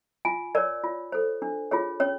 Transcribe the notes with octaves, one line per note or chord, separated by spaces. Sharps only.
F4 G#5
A#4 C#5 D5
F4
A4 C5
D4
F4 G#4 C#5
C#4 C#5